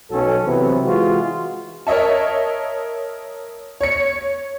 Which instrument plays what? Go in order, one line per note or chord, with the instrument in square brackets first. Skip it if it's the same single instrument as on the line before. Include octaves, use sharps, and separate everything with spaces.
[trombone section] B1 F#3 C#4 A4
C3 E3 F#3 B3 C4
E3 G#3 F4 F#4
[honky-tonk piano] A#4 C#5 D#5 E5 A5
C#5 C#7